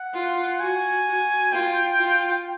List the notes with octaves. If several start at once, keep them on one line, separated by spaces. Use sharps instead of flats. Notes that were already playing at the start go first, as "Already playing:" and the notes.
Already playing: F#5
F4
F#4 G#5
F#4
F4 G5
F4